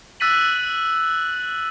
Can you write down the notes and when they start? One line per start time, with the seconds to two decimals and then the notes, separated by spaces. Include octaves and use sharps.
0.20 E6 F#6 A6 B6 D#7 F#7